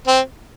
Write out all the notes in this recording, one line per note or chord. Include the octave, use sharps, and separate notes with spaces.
C4